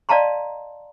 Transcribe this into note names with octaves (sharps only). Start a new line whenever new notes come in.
D5 D#5 F5 A5 A#5 C6